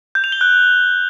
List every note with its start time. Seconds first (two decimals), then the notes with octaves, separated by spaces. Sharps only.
0.15 G6
0.24 F7
0.32 G7
0.41 F#6